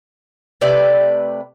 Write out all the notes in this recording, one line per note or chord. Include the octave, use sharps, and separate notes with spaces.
C3 A3 B4 D5